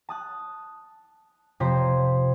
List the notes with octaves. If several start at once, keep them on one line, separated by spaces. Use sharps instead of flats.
A5 D#6 F#6
F2 C3 F4 C5 C6 B6